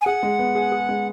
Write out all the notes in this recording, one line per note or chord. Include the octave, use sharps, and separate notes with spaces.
G#5
G#4 F#5
G#3
B3
G#4
G#4
G#3